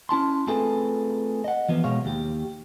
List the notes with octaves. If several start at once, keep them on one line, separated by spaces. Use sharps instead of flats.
C#4 E4 A5 C6
A3 C4 F4 G#4 A4 B4
D#5 F#5
E3 F3 B3
B2 G#3 C#5 F5
D#2 G4